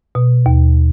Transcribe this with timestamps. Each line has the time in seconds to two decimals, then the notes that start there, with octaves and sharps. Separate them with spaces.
0.15 B2
0.46 D#2